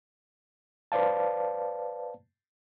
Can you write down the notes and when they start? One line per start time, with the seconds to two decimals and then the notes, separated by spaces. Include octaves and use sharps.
0.92 B4 C5 D5 F5 A5